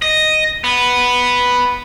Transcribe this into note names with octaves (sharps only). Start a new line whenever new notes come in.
D#5
B3